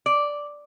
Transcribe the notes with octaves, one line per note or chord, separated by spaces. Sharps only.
D5